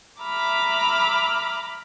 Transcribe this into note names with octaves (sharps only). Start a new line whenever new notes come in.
E5 A#5 B5 D6 F6